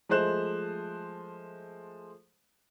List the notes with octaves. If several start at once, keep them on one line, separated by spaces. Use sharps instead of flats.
F3 G#3 A3 C5 F#6 E7